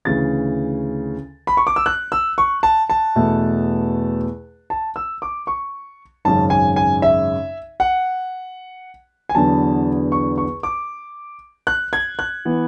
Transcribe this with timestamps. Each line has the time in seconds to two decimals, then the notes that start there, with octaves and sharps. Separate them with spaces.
0.05 D2 C#3 E3 A6
1.47 B5
1.57 C#6
1.67 D6
1.76 E6
1.86 F#6
2.12 E6
2.38 C#6
2.63 A5
2.90 A5
3.15 E2 B2 A3
4.70 A5
4.96 E6
5.22 D6
5.47 C#6
6.25 G#1 F#2 C#3 A5
6.50 G#5
6.76 G#5
7.02 E5
7.80 F#5
9.29 G#5
9.35 E2 D3 F#3 B3 A5
10.12 C#6
10.38 C#6
10.63 D6
11.67 F#6
11.93 G#6
12.19 F#6
12.45 E3 B3